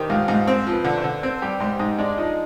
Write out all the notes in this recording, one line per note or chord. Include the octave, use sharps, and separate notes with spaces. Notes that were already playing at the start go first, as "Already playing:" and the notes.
Already playing: D#3 D4 G4 B4 C5 G5
G#2 F4 F5
G#2
C4 C5
F3
B4
D3
C5
D3
C4 C5
G3 G4 G5
G#2 C5 C6
G#2 D#4 D#5
G#3 D4 D5
F3 D#4 D#5